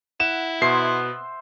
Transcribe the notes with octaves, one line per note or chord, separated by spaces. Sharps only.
E4 F#5 E7
B2 B3 C5 E5 C6 C7